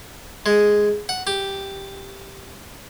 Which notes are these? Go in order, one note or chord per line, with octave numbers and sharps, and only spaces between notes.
G#3
F#5
G4